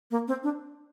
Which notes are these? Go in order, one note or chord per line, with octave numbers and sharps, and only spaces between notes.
A#3
C4
D4